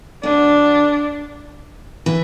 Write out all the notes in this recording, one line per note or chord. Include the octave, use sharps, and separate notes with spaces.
D2 D3 D4
E3